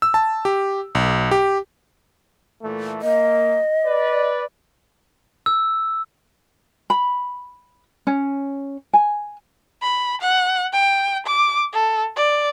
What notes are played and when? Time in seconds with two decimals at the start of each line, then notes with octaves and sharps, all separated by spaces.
0.02 E6
0.14 A5
0.45 G4
0.95 B1
1.31 G4
2.62 A#2 E3 A3
3.02 A#3 D#5
3.84 B4 D5
5.46 E6
6.90 B5
8.07 C#4
8.93 G#5
9.82 B5
10.21 F#5
10.73 G5
11.26 D6
11.73 A4
12.16 D5